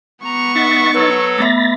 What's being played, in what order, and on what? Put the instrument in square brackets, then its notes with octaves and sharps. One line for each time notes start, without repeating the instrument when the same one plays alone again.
[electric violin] B3 C#6 [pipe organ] A#5
[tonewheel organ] D#4 A6 [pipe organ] E5 F#5
[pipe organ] F#3 A4 [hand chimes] B4
[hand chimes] A3 B3 E5 [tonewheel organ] B5 A6 A#6